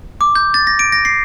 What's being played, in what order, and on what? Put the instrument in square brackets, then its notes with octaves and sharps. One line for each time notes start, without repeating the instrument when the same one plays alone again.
[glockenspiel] D6
G6
A6
A#6
D7
A#6
C7